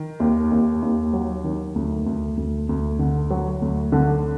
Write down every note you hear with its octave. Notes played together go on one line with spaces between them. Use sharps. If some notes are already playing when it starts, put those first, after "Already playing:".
Already playing: D#3
D#2
D#2
D#2
F#3
D#3
D2
D2
D2
D2
D3
F#3
D2
D3